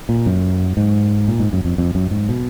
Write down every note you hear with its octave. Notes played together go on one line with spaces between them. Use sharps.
A#2
F#2
G#2
A#2
G#2
F#2
F2
F2
F#2
G#2
B2